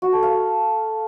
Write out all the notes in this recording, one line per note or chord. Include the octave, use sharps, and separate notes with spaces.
F#4
A4
F5